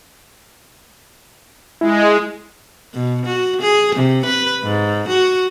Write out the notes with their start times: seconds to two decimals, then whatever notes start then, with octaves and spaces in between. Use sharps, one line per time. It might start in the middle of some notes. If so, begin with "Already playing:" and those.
1.81 G#3 E4
2.94 B2
3.26 F#4
3.62 G#4
3.95 C3
4.26 B4
4.63 G#2
5.08 F#4